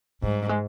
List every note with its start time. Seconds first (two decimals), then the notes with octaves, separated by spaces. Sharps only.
0.23 G#2 G3
0.49 G#3